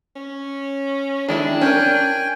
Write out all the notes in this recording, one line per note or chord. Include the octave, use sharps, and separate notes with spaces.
C#4
D#3 G#3 D4 E4
C#4 A#4 G5 G#5